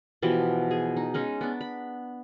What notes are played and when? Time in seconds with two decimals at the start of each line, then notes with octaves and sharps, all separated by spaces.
0.22 B2 E3 F3 G4
0.71 G#4
0.97 D#4
1.14 G#3 C#4 D#4
1.41 B3 D4
1.61 B5